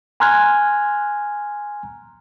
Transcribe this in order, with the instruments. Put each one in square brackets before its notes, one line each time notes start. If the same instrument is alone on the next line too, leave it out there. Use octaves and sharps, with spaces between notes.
[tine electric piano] G#5 A#5 C6 F6 F#6 G#6